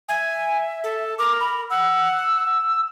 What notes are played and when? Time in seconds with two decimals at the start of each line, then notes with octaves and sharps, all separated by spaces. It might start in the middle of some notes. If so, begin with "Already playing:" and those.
0.08 E5 G#5
0.84 A4
1.18 A#4 D6
1.39 B5
1.70 F#5 E6